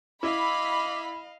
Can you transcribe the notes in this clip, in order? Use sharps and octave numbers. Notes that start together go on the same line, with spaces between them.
E4 D#5 F5 B5 D6